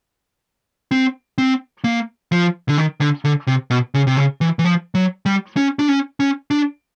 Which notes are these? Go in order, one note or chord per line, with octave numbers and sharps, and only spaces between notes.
C4
C4
A#3
F3
D3
D#3
D3
D3
C3
B2
C#3
C3
C#3
E3
E3
F3
F#3
G3
C#4
D4
C#4
C#4
D4